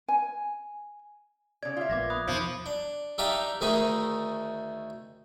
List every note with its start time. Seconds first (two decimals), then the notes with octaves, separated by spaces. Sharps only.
0.08 G#5
1.63 C#3 D5 G#6
1.76 F4 E5
1.90 A#1 A#3 B3 D6 G#6 A#6
2.10 B5 D#6 F#6
2.27 E2 B2 D#3 F3
2.66 D4
3.18 D4 D#4 G4 E5 F5 A5
3.61 D2 D#3 A3 D#4 G#4 B5